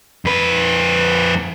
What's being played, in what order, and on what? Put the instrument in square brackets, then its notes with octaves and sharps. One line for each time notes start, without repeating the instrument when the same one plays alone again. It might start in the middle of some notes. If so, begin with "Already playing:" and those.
[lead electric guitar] F2 B4